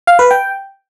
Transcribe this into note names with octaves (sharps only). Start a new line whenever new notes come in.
F5
B4
G5